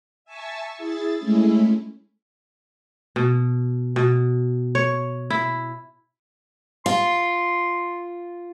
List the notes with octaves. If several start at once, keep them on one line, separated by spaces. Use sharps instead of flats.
E5 G#5 A5 C#6 E6
E4 G#4 A6
G#3 A3 C#4 E4
B2
B2
C#5
E4
F4 C6